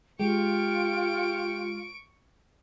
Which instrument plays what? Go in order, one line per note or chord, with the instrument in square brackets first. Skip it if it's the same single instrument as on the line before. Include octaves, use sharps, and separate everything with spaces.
[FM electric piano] G#3 [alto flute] F4 [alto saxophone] G4 [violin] C#6 D7